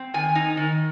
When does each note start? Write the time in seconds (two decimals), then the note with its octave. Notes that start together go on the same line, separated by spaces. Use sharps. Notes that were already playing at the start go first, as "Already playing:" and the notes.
Already playing: C4
0.14 D#3 G#5
0.35 D#4
0.57 D#3